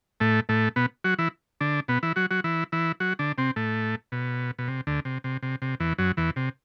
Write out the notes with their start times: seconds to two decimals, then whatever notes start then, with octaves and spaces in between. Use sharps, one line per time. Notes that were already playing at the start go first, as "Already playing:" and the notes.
0.20 A2 A3
0.49 A2 A3
0.76 B2 B3
1.04 F#3 F#4
1.18 E3 E4
1.61 D3 D4
1.88 B2 B3
2.03 E3 E4
2.16 F#3 F#4
2.31 F#3 F#4
2.44 E3 E4
2.72 E3 E4
3.00 F#3 F#4
3.19 D3 D4
3.38 C3 C4
3.56 A2 A3
4.12 B2
4.59 B2
4.68 C3
4.87 D2 D3
5.05 C3
5.24 C3
5.43 C3
5.62 C3
5.80 E2 E3
5.98 F#2 F#3
6.17 E2 E3
6.36 C3